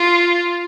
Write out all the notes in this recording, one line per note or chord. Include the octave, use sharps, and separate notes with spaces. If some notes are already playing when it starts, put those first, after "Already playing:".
Already playing: F4